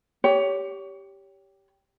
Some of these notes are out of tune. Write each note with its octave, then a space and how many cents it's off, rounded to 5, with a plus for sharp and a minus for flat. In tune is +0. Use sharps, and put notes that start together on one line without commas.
G4 +0 C#5 +25